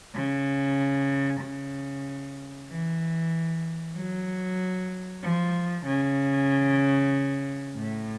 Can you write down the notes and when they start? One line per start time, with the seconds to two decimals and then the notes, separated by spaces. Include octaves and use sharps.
0.15 C#3
1.41 C#3
2.69 E3
3.96 F#3
5.23 F3
5.86 C#3
7.77 A2